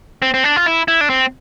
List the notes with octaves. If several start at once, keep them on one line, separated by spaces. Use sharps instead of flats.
C4
C4
D4
F4
E4
E4
D4
C4